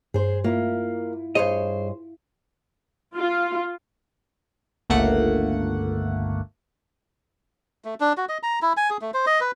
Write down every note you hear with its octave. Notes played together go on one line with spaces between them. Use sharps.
G2 G#4 C5
A#3 E4 F4
G2 G#4 C5 C#5 D#5
F4
G1 C#2 A3 A#3 F#5
A3
D4
F#4
D#5
A#5
E4
G#5
G#4
A3
C5
D#5
B4